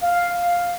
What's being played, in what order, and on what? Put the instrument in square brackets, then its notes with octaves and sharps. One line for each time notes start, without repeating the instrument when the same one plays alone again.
[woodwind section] F5